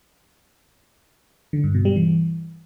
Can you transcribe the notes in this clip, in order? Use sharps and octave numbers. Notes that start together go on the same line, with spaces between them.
D3
G2
B2
G3
E3